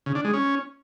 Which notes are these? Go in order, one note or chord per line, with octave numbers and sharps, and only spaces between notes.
C#3
D4
G#3
C#4